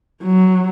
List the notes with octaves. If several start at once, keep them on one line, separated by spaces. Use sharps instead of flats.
F#3